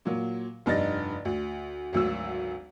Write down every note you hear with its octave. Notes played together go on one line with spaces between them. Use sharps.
A#2 F#3
F1 G2 D#4 D#5 A6 A#6
D2
G#1 D2 F#3 E6